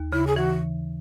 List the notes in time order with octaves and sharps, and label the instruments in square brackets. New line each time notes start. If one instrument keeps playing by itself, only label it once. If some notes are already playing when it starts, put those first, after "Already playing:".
Already playing: [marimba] D#2
[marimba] C#3 [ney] E4
[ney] G#4
[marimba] E3 [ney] F#4